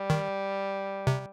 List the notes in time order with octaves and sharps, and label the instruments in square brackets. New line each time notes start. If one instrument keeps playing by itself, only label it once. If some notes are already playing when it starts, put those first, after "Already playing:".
Already playing: [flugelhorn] G3
[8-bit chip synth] D#3
C3